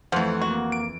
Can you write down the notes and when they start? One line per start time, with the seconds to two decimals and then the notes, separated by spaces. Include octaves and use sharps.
0.12 F2 E3 F3 A3 F#5
0.41 A#3 F#4
0.72 D7